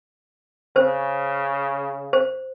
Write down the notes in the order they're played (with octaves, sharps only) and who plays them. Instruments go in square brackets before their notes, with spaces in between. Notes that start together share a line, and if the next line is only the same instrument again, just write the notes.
[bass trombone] C#3 [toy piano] C5
[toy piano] C5